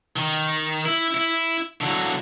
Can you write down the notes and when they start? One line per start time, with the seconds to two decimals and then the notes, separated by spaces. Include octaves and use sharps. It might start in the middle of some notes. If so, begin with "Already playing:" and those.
0.16 D#3
0.85 E4
1.15 E4
1.81 D3 F#3